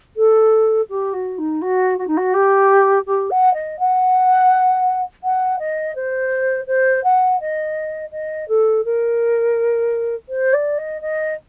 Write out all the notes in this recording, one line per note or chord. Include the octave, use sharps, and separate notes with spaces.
A4
G4
F#4
D#4
F#4
F#4
D#4
F#4
G4
G4
F#5
D#5
F#5
F#5
D#5
C5
C5
F#5
D#5
D#5
A4
A#4
C5
D5
D#5
D#5